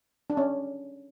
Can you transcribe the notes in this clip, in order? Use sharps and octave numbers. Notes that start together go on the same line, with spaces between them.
D4
C#4